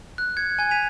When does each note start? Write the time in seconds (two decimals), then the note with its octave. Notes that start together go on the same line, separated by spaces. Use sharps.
0.18 F#6
0.37 G#6 C#7
0.59 G#5 G#6
0.71 B6 D#7 F7